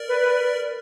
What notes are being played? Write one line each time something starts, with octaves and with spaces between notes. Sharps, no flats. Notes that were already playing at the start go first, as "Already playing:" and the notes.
Already playing: A#4 D5
B4
B4